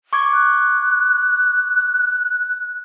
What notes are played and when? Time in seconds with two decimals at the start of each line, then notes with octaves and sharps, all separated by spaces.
0.13 C#6 D6 G#6
0.33 F#6